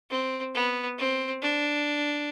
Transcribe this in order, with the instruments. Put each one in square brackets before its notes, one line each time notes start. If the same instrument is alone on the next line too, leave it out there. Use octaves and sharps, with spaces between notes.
[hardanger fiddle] C4
B3
C4
D4